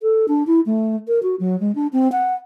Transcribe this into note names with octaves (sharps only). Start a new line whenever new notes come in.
A4
D4
E4
A3
A#4
F#4
F#3
G#3
D4
C4
F#5